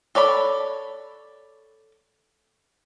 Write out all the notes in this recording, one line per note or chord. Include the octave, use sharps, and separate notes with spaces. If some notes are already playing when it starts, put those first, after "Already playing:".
A4 C#5 D5 B5